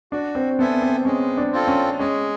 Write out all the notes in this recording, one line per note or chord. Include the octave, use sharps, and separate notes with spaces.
D4 F#4
C4
B3 A4 C5 E5 G#5
C4
G#3 C#4
D4
C4 F4 A4
C#4
G#3 C#4